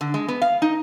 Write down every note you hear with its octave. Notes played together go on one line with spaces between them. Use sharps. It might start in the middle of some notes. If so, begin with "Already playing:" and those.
D3
G#3
B3
F5
D#4